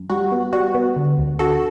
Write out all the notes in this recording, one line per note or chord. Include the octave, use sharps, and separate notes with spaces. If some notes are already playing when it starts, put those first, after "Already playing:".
Already playing: F#2
G3 F#4
B3
G3 F#4
B3
D3
D2
D3 F#4 A4